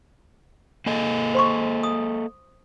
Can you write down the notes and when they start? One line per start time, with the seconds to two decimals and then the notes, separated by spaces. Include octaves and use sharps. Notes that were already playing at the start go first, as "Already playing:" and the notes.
0.86 A#3 A4 D#5
1.34 C5 C6 C#6
1.83 D#6